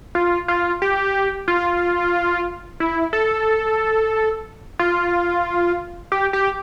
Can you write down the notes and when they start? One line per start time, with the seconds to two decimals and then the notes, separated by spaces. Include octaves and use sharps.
0.15 F4
0.48 F4
0.82 G4
1.48 F4
2.80 E4
3.13 A4
4.79 F4
6.12 G4
6.33 G4